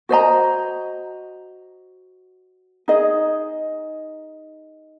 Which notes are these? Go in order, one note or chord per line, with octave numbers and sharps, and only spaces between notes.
F#4 C5 D#5 A#5
D#4 G#4 D#5